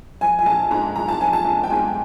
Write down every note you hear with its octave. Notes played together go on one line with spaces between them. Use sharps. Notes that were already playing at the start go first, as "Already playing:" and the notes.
F3 G#5
G#5
A#1 A5
G#2 A#5
A#1 A#5
A5
F3 G#5
A5
A#1
G5
G#2 G#5